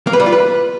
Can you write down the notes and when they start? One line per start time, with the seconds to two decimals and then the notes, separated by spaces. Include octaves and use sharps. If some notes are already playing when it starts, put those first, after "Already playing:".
0.07 A#3
0.13 B4
0.20 G3
0.26 F4
0.32 B4